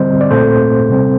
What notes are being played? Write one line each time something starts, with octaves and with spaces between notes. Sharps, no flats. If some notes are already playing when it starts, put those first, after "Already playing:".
Already playing: D3 G3 C4 C5 D#5
D5
A#2 A3 C4 A4 C5
C3 G3 C4